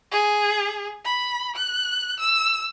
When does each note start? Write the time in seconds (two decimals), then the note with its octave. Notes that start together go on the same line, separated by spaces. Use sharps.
0.12 G#4
1.05 B5
1.56 F#6
2.19 E6